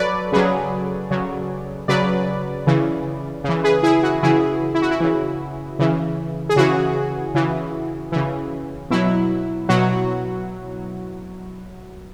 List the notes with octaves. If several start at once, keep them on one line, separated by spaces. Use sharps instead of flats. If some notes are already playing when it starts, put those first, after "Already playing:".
Already playing: F#3 A4 B4 C#5 D5
C#3 F#3 G#4 B4
C#3 F#3
C#3 F#3 B4 D5
C#3 E3
C#3 E3
G#4 B4
E4 G#4
F#4
C#3 E3 E4 G#4
E4
F#4
E4
C#3 E3
C#3 E3
G#4
C#3 E3 F#4
C#3 E3
C#3 E3
B2 F#3 E4
B2 F#3 F#4